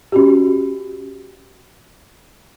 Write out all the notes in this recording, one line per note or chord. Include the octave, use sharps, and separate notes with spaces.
C#4 F#4 G4